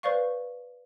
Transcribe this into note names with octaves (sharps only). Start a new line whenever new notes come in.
B4 C5 D5 F5 C#6